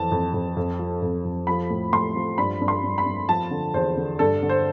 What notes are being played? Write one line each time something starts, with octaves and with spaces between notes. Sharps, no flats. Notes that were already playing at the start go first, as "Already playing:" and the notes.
Already playing: F2 E3 A5
F2
F2
F2
F3
F2
F2
F3 B5
A2
A2 C6
F3
G2 B5
G2
C6
G2
B5
G2
F3 A5
D3
E2 C5
D3
G2 A4
D3
C5